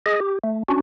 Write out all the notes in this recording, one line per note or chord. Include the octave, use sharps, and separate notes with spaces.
G#4 D#5
G4
A3
C#4 D4 F#4